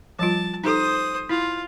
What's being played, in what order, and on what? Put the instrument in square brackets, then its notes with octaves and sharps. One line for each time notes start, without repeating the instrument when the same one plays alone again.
[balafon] F3 G3 F4 [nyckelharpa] A5
[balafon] D#4 G4 A4 [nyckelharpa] C5 D#6
[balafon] E4 [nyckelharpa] F4